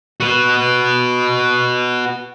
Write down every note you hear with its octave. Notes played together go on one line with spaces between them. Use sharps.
F#4 B4